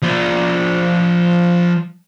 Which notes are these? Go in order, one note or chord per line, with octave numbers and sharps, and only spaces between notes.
F3 D5